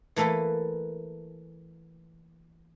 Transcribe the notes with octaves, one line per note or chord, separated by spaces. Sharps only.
E3 A3 A#3 A4 B4